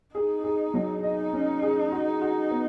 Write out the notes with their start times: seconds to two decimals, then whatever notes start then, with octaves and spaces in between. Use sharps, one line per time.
0.15 D#4 G#4
0.44 G#4
0.74 F#3
1.03 D#4 D#5
1.33 C#4
1.62 G#4
1.92 F#4
2.21 F#4
2.51 B3